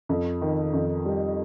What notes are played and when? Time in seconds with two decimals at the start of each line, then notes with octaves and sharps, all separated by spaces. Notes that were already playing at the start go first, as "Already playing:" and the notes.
0.09 F2
0.41 D#3
0.74 F2
1.05 G3